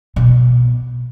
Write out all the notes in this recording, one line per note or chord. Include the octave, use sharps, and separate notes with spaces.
B2